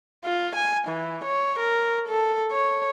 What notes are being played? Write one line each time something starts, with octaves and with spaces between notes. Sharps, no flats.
F4
G#5
E3
C#5
A#4
A4
C#5